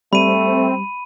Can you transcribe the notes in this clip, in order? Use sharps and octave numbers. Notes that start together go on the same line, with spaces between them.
G3 A3 C4 B5 D#7